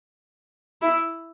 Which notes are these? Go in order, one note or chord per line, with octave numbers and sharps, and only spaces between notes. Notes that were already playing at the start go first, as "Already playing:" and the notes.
E4